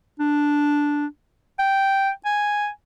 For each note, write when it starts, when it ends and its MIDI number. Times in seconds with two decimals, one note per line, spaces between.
0.20 1.06 62
1.59 2.10 79
2.25 2.69 80